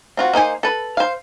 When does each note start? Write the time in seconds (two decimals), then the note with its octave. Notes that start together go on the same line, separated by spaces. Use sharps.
0.17 C4 F4 F#4
0.33 A#3 D#4 C5 G#5
0.63 A4 B4
0.97 C5 F5